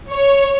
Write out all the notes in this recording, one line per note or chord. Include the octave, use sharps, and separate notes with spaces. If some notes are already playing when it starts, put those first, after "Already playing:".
C#5